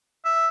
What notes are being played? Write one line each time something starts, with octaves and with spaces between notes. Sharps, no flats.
E5